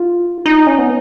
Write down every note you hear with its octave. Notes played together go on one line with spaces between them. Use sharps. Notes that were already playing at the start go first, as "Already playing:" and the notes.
Already playing: F4
D#4
C#4
B3